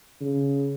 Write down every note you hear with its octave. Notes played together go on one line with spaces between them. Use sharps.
C#3